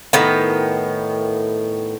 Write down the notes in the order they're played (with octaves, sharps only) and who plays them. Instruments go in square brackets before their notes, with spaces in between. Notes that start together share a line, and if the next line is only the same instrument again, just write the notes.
[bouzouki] A2 D#3 B3